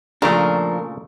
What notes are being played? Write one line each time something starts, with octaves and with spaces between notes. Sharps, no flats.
A#2 C#3 F3 A3 D4 A#4